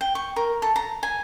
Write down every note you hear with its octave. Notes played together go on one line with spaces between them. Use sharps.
G5
C#6
A#4
A4
A#5
G#5